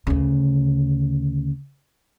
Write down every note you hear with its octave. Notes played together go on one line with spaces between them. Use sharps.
D2 C#3